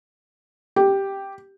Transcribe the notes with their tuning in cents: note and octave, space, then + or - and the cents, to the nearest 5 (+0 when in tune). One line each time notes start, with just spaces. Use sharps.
G4 +0